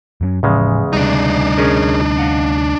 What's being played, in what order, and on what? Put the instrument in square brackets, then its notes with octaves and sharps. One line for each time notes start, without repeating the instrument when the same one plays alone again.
[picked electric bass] F#2 F#3 C#4
[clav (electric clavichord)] E2 C#3 G#3 [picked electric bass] A2 F3
[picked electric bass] D2 C3 G3 [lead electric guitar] D4 D#4
[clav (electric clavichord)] C#4 G#4 A#4
D#5 F5 F#5